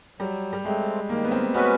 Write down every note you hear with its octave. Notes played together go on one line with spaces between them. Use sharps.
F#3 G3
G3
G#3 A3 C4
D#3 A#3
B3
C4
G#3 B3 C#4 F#4 B4